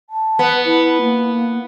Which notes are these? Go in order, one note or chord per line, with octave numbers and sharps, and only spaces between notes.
A5
B3
E4
A#3